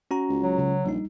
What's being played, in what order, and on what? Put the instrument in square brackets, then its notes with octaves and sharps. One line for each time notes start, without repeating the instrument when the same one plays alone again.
[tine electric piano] C#4 F#4 A#5
[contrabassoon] C#2
[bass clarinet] F#3
[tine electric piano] C#3
[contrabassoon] A#1 [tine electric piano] G3 D#4